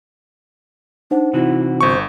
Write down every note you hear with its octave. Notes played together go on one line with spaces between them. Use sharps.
D4 D#4 C5 F#5
C3 E3 E4 F#4
G1 C5 C#6